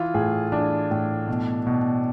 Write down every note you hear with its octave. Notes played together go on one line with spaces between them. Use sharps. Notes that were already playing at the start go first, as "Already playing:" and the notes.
Already playing: E3 F4
A2 G#4
E3 D4
A2
B2
B2